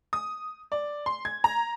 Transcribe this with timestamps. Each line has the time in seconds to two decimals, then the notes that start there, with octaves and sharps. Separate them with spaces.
0.13 D#6
0.72 D5
1.06 C6
1.25 G#6
1.44 A#5